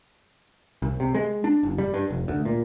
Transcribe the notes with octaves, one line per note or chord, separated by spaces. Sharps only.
C2
C3
G#3
D4
F#1
G3
G2
F1
D2
A#2